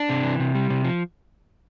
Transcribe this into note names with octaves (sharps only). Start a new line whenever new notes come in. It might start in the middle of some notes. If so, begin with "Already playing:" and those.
Already playing: D4
C3
E3
C3
G3
C3
F3